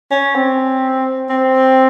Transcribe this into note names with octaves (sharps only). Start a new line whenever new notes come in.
C#4
C4
C4